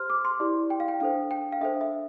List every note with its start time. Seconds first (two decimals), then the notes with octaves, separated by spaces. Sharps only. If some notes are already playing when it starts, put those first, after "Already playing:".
Already playing: G4 C5 C6 F6
0.10 D6
0.25 C6
0.40 E4 G4 D5
0.70 G5
0.80 F5
0.88 G5
1.00 D4 A4 C5 F5
1.31 G5
1.52 F5
1.61 D4 A4 C5 E5
1.81 E5